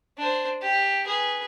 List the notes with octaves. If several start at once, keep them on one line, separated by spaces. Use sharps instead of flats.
D4 C5
G4
G#4 B4